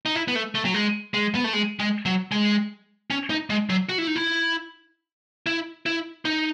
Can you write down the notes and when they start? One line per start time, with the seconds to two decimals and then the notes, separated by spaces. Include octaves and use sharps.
0.06 D#4
0.15 E4
0.28 B3
0.35 A3
0.55 A3
0.65 F#3
0.74 G#3
1.14 G#3
1.35 B3
1.44 A3
1.53 G#3
1.80 G#3
2.06 F#3
2.32 G#3
3.10 C#4
3.30 D#4
3.50 G#3
3.70 F#3
3.89 F#4
3.98 E4
4.07 D#4
4.16 E4
5.46 E4
5.86 E4
6.25 D#4